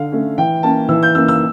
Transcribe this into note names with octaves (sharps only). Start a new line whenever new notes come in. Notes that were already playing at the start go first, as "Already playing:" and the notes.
Already playing: D3 F5
A3 C#4
E3 G5
A#3 C#4 A5
E3 E6
G6
A#3 C#4 E6
E6